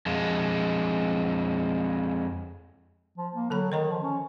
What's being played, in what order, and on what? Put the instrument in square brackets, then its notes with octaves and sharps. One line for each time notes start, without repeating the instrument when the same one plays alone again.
[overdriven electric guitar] F2 G#3
[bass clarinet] F3
A#3
[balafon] D3 A4 B5 [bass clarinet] F#3
[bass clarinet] D#3 [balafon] C#5 D#5 A#5
[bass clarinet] F3
C#4